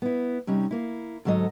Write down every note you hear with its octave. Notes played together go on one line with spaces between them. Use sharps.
B3 E4
C3 G3 C#4 D#4
A#3 E4
D2 G#2 F#3 A4 D#5